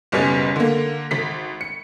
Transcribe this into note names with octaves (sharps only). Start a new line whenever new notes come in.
F#1 B1 G3 B3 C#4
D3 A#3
G#1 B6
C#7